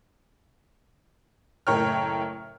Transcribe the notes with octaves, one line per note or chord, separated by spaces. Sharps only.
F#1 A2 A#4 C#5 G5 F6